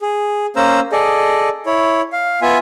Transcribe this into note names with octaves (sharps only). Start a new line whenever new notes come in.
G#4
A#3 C#4 C5 A#5 E6
G#4 A4 D5 D#5
E4 C#5
F5
B3 F4 E5 G#5